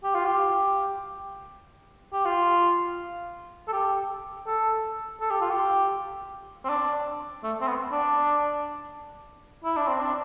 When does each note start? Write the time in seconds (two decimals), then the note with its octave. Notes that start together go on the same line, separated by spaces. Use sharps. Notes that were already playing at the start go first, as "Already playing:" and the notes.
0.04 G4
0.14 F4
0.25 G4
2.13 G4
2.25 F4
3.68 A4
3.73 G4
4.47 A4
5.21 A4
5.31 G4
5.41 F4
5.50 G4
6.64 C4
6.69 D4
7.43 A3
7.61 C4
7.67 B3
7.92 D4
9.64 E4
9.76 D4
9.87 C4
10.00 D4